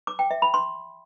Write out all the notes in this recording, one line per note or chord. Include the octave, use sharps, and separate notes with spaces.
D6
G5
E5
B5
C6